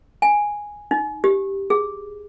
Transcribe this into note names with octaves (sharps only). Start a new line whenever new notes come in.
G#5
D#4
G4
G#4